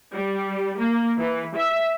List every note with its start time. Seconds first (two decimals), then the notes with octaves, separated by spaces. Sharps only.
0.13 G3
0.79 A#3
1.18 E3
1.56 E5